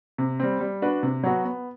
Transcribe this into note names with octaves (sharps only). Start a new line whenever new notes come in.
C3
G3 C4
G3
D4 F#4 B4
C3
F#3 B3 F#4
B3